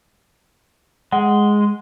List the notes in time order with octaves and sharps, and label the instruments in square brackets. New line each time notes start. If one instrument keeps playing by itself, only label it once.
[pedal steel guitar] G#3 [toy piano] F#5